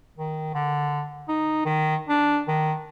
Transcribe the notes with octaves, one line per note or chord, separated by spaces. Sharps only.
D#3
D3
D#4
D#3
D4
D#3